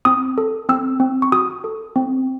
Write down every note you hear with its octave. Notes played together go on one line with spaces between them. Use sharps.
C4 D#6
A4
C4 E6
C4
C#6
F#4 D#6
A4
C4